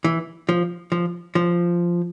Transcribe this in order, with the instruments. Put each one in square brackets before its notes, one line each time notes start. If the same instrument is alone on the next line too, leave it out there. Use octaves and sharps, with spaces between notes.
[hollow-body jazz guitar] E3
F3
F3
F3